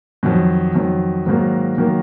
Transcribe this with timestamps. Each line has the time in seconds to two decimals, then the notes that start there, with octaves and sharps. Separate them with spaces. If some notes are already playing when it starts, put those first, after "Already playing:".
0.23 F2 D#3 F#3
0.74 F2 D#3 F#3
1.26 G#2 D#3 F#3 A#3
1.78 D#3 F#3 A#3